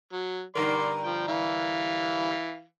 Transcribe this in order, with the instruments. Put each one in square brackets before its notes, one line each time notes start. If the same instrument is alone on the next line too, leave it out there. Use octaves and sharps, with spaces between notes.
[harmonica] F#3
[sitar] G2 D3 A#4 [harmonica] D5 C6
[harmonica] F3 G5
E3 F5